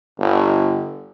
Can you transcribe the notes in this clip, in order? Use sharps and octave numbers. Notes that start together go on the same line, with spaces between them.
G1